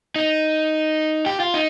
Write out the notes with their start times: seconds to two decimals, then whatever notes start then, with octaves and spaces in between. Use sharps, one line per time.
0.16 D#4
1.26 G4
1.40 F4
1.54 D#4